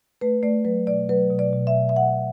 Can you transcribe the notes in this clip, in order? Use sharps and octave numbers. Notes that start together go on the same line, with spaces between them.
A3 B4
A3 D5
F#3 B4
B2 D5
F#3 B4
B2
D5
B2
E5
B2
E5
B2 F#5